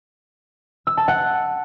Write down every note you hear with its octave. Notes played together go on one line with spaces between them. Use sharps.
E6
A5
F#5